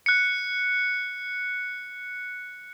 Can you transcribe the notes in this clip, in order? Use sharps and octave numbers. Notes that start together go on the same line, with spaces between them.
F#6 C#7